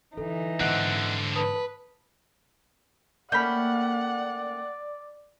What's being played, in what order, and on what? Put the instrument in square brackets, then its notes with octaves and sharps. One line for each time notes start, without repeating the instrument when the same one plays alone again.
[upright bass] D3 [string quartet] E3 D#4 [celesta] A4
[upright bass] G#2 [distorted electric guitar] D3 C4 [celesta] D#5 F#5 F#6
[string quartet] B4 [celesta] A5 D#6
[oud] A3 A#3 C#4 [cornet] D5 [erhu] F#5 [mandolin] G5 B5